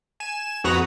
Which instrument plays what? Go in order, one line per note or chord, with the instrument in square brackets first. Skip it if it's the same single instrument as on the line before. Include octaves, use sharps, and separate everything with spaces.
[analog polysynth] G#5 E7
F2 F#4 B4 A#5 D#6